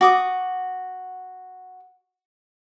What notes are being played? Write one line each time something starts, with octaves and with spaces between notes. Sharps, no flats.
F#4 D6 D#6